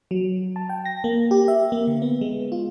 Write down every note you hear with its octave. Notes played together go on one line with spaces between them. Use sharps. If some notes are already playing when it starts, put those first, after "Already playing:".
F#3
A5
G5
A#6
A#3
G4
E5
A#3
D3
B3
G#3
F4